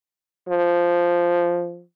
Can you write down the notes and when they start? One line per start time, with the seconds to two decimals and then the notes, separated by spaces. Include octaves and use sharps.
0.49 F3